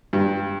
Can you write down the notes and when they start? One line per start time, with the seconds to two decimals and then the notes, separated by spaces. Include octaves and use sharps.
0.13 G2